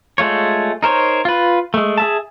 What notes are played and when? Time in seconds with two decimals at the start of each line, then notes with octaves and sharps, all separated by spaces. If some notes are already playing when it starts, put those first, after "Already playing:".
0.18 G#3 A3 F4 C#5
0.83 D#4 A#4 C5 C#5
1.25 F4 B4
1.74 G#3 A3
1.98 G#4 E5 A5